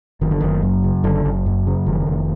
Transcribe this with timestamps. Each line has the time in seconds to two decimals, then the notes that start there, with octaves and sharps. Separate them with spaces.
0.21 F#1 D#3
0.31 D3
0.41 F#1 D#3
0.62 F#2
0.84 C#3
1.04 F#1 D3
1.25 F#1
1.46 F#2
1.67 C#3
1.86 F1 D#3
2.07 F1